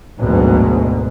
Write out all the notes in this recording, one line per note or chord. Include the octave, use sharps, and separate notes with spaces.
G#1 D2 G#2 B2 F#3 G#3